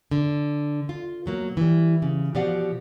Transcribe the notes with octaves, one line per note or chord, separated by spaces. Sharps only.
D3
F4
B2 F#3 A#3
E3 G3
C#3
B2 F3 G4 D5 F5 F#5